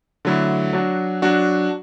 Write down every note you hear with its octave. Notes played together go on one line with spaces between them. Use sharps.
D3 F#3 A3 E4
F#3 D4 F#4
F#3 D4 F#4